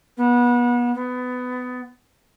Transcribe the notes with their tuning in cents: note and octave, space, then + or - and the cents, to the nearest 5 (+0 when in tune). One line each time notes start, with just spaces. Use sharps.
B3 -30
B3 +20